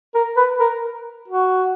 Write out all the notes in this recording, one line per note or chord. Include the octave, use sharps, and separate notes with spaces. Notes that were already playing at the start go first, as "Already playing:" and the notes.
A#4
B4
A#4
F#4